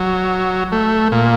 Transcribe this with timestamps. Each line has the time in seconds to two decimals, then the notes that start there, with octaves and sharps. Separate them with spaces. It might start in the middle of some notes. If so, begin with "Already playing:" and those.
Already playing: F#3
0.72 A3
1.12 A#2